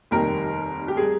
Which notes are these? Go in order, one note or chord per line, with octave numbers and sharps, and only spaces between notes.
F1 D#2 D#3 G3 A#4
G4
G3 G#4